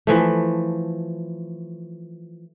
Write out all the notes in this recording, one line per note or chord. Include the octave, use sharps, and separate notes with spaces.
E3 F3 A3